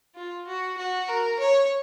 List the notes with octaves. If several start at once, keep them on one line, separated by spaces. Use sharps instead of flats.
F4
F#4
F#4
A#4
C#5